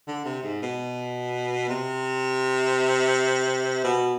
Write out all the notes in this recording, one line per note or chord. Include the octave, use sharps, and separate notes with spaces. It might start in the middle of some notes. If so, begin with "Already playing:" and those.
D3
C3
G#2
B2
C3
B2